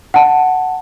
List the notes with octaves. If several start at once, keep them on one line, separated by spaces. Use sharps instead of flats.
F#5 A5